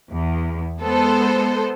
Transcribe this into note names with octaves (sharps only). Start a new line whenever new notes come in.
E2
G#3 B3 A4 C5